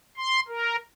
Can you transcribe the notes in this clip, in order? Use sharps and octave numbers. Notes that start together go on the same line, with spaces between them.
C6
A#4